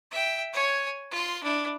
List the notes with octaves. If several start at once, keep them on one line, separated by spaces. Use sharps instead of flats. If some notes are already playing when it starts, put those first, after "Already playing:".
E5 G5
C#5 G#5
F4 C6
D4 E4